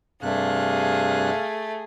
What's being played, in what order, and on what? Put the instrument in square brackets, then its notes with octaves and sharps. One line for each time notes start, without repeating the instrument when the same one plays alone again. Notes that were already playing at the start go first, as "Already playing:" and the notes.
[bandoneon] G2 C3 F#6 [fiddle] A3 [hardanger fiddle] G#4 [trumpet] F5